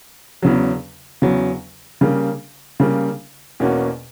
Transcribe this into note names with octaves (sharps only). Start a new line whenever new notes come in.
E2 C#3 F#3
E2 C#3 F#3
C#3 G3 A#3
C#3 G3 A#3
E2 B2 A#3 C#4 F#4